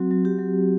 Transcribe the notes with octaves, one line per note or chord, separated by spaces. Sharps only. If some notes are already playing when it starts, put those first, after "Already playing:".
Already playing: F#3 C4 F#4
F#3
G4
F#3